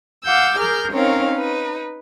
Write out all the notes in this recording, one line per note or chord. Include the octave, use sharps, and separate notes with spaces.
F5 F#5 D6 E6 G6
G#4 A#4 F6 G6
C4 C#4 D#4 A#4 C#5 F5
D#4 B4